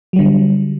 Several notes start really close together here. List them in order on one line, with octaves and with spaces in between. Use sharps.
F#3 G3 D3